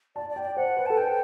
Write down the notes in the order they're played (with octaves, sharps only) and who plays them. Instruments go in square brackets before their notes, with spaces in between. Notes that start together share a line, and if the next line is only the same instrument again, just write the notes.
[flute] D5 [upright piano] A5
[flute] D5
[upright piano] G5
[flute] D5
[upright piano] C5 [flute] F#5
[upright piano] B4
[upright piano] A4 [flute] A5
[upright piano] B4 [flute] G5